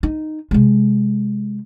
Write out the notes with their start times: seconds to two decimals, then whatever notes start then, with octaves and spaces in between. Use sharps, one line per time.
0.03 D#4
0.51 C3 G#3